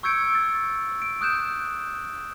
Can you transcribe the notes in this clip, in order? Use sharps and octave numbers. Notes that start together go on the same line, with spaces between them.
C#6 E6 G6 G#6 C#7 D7
A6
D7
D#6 F#6 G6 E7